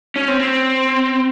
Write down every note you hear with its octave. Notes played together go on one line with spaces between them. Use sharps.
C#4
C4
C4